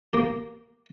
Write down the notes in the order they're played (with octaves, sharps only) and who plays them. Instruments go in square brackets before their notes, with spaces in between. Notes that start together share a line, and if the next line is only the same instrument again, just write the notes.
[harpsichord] A#3 G4